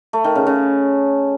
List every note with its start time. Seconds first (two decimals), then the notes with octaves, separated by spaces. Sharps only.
0.13 A3
0.24 D#3
0.35 C#3
0.47 C#3